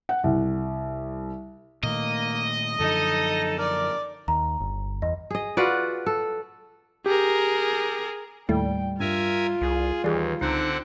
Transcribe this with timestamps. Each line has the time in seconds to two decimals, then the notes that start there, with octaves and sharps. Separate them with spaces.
0.09 F#5
0.24 C2
1.83 A#2 D#3 A3 A#3 D#5
2.80 F#2 D3 F3 D#4 A4
3.59 A#4 D5
4.28 D#2 A#5
4.60 G1
5.02 E2 D#5
5.30 G#4 D#5
5.57 F4 F#4 B4 D5
6.06 A4
7.06 G4 G#4 A#4
8.49 D#2 A2 G3 A3 G5
9.00 G2 F4 A#4 E5 G#5
9.61 C2 G#4
10.04 D#2 E3 G3 G#4
10.41 C#2 D3 C4 D#4 F#5